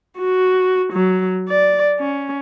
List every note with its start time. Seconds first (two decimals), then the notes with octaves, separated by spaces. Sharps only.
0.18 F#4
0.93 F#3
1.49 D5
2.00 C#4